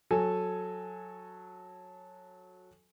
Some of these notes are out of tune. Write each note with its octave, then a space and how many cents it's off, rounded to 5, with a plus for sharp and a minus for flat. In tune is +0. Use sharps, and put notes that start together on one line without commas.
F#3 -15 A4 -5 G#5 +0